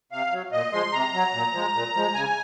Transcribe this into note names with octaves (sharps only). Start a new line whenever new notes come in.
C3 F5
F#3
A#2 D#5
F3 G#3 C6
C3 A#5
F#3
A#2
F3 G#3
A#2
F3 G#3
C#3 G#5